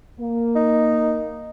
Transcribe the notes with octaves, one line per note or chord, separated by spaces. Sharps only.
A#3
D#4